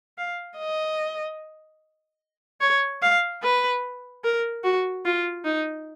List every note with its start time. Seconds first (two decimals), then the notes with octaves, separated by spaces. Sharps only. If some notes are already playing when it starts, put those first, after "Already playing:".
0.18 F5
0.58 D#5
2.61 C#5
3.02 F5
3.43 B4
4.24 A#4
4.64 F#4
5.05 F4
5.45 D#4